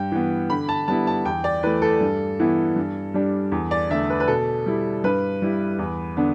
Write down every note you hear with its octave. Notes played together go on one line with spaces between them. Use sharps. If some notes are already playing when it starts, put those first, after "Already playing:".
Already playing: G2 G5
E3 B3
D3 B5
A5
G3 B3 E4 A5
A5
E2 G5
D5
E3 A3 B4
A4
G2
E3 B3 E4
G2
G3 D4
E2
D5
D3 A3 E5
B4
B4
B2 A4
G3 E4
G2 B4
G3 E4
E2
D3 B3 D4